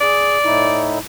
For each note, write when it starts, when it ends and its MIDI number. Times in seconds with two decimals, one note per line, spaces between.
0.01 0.37 68
0.01 0.94 74
0.45 0.99 45
0.45 0.99 63
0.45 0.99 64